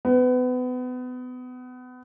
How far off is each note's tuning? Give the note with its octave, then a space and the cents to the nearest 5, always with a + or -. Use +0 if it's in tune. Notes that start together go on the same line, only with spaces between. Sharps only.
B3 +30